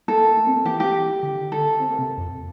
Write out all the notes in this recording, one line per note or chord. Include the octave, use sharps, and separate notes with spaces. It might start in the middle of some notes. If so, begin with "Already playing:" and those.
A#3 A4
A#3
A3
C4
A#3
E3 G4
G4
D3
A4
C4
A#3
C3
F2